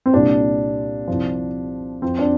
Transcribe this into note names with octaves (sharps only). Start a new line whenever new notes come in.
C4
C2 A#2 G3 D4
C2 C3 F3
F2 F3 C4
D4